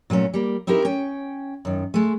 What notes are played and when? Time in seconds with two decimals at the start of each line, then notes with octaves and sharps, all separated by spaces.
0.10 A#2 F#3 A3 C#4
0.34 G3 A#3
0.67 C4 D#4 E4 G4 A#4
0.85 C#4 G5
1.65 F#2 D#3
1.94 G#3 A3